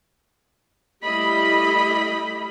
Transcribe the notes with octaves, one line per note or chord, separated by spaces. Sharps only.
G3 A3 E4 G4 D#5 B5